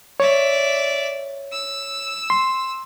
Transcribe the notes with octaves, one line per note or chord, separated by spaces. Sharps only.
C#5 D5 E5
E6
C6